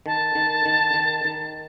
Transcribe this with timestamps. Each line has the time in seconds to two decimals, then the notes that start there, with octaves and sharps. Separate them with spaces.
0.06 D#3 A5
0.35 D#3
0.66 D#3
0.94 D#3
1.24 D#3